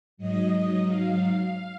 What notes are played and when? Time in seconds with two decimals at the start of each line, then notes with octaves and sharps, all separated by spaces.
0.17 G#2 F#3 D#5
0.52 D#5
0.86 F5